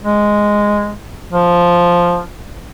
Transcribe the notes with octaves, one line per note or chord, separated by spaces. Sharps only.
G#3
F3